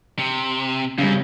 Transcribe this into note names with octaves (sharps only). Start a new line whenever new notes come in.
C3
F#2 C#3 G3